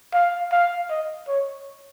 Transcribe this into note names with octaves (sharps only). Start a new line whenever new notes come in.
F5
F5
D#5
C#5